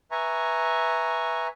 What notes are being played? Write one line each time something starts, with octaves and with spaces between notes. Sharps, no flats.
B4 E5 G#5 A#5 C#6